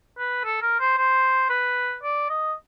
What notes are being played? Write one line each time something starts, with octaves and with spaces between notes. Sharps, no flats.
B4
A4
A#4
C5
C5
B4
D5
D#5